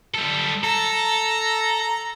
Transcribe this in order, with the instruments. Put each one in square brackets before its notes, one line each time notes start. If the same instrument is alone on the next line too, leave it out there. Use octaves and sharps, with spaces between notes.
[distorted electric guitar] G3 A4
[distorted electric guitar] A4 [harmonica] A#5